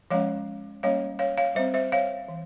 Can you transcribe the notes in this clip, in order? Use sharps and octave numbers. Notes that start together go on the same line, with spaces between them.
F3 G#3 C#4 C#5 F5
G3 A#3 C#4 C#5 F5
C#5 F5
C#5 F5
G3 C4 C5 E5
C5 E5
C#5 F5
E3